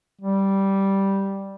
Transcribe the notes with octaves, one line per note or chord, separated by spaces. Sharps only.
G3